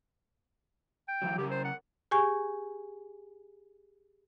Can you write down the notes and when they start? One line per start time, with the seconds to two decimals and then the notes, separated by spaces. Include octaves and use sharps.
1.08 G5
1.22 E3 F#3
1.38 C#3 G4 A#4
1.51 C5
1.65 F#5
2.11 G4 G#4 G#5 C#6